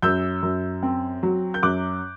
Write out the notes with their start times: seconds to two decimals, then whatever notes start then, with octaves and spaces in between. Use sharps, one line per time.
0.02 F#2 E6 G6
0.43 F#2
0.83 C4
1.23 F#3
1.54 G6
1.63 F#2 D6 F#6